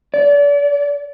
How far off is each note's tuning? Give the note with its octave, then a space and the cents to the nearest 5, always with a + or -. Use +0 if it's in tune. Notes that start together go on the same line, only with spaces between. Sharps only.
D5 -35